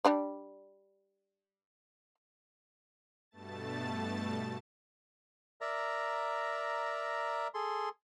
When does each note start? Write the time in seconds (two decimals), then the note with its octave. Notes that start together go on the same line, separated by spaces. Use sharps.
0.05 G3 D4 D5
3.31 G2 B2 A3 A5 A6
5.61 A#4 D5 E5 A#5
7.54 G#4 A4 C6